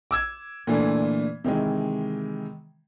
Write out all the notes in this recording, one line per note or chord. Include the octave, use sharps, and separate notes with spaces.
D6 E6 G#6
A#2 D3 E3 A3 D4
C3 D#3 E3 G#3